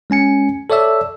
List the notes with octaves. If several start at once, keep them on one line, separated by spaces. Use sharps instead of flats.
G#3 C#4 G#5 C#7
A4 C#5 D5 E5 E6